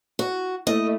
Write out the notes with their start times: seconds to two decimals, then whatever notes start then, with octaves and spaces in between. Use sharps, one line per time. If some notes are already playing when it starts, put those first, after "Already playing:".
0.19 F#4
0.67 A3 A#3 E4 D#5